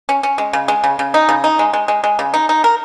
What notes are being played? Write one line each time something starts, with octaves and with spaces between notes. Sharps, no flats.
C#4
C#4
G#3
C#3
G#3
C#3
C#3
D#4
C#3
D#4
G#3
G#3
G#3
G#3
C#3
D#4
D#4
A#4